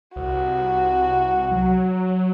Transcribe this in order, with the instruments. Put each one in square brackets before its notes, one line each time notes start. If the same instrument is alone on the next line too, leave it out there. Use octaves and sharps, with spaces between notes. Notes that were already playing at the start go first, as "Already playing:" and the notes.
[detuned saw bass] C2 [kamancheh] F#4
[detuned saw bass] F#3